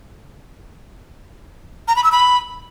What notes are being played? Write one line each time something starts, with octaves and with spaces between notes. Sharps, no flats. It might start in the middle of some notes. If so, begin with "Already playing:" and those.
A#5
B5
E6
B5